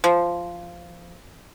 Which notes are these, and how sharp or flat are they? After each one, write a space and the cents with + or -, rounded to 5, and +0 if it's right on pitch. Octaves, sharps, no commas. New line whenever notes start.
F3 -10